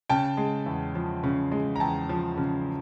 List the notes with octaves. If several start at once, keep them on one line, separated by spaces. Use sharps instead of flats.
C#3 G5 A5
G#3
E2
F3
C#3
G#3
A#5
E2 G5 A5
F3
C#3